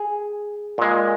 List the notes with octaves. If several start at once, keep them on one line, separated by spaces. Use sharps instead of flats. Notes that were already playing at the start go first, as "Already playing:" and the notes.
Already playing: G#4
A#2 G#3